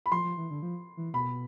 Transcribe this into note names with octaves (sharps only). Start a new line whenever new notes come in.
B5
F3 C6
F3
E3
D3
F3
E3
B2 B5